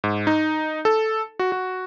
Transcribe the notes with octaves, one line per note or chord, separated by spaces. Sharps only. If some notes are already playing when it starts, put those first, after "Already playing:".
G#2
D#4
A4
F#4
F#4